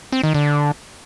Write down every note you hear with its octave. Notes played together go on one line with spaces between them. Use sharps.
C4
D#3
D3